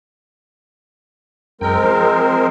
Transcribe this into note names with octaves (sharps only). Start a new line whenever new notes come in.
F#2 G#3 C4 A#4 G5
F3 G#4 C5